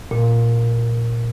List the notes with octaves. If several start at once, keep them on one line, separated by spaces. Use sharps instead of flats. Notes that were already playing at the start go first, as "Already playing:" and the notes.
A#2